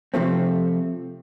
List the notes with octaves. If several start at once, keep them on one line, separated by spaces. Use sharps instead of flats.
C3 F3 A3 C4